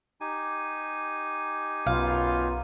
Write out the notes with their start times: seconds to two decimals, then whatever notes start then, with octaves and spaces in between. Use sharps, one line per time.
0.21 D#4 G4 G#5
1.86 B1 F#2 B3 F4 F5